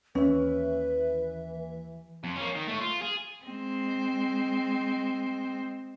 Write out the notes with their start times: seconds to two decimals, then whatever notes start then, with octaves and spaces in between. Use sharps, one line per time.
0.15 D#2 E3 C#4 B4 E5
2.24 F2
2.36 A#3 C#4
2.55 D#3
2.67 A3 C#5
2.81 F4
3.01 G#4
3.45 G#3 C4